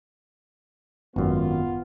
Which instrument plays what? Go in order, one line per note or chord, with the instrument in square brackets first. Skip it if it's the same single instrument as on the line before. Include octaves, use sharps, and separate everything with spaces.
[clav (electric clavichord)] G#1 F#2 [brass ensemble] B3 F4